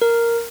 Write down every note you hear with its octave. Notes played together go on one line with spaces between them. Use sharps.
A#4